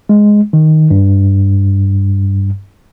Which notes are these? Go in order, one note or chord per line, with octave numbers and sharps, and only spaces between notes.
G#3
D#3
G2